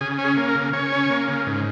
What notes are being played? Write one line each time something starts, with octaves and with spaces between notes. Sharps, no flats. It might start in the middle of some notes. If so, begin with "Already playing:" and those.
C#3 G#4
C#4
G#4
A#3
A#4
C#3
C#3 C#5
C#4
A#3
C#3
G#2